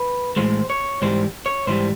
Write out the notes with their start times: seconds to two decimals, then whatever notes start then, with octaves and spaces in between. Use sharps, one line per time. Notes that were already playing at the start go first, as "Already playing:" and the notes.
Already playing: B4
0.36 A2 E3 G#3 C5
0.70 C#5
1.02 G#2 E3 G3 C5
1.46 C#5
1.67 G#2 E3 G3 C5